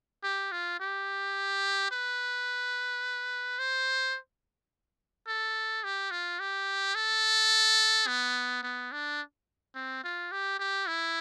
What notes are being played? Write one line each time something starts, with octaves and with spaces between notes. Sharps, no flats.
G4
F4
G4
B4
C5
A4
G4
F4
G4
A4
B3
B3
D4
C4
F4
G4
G4
E4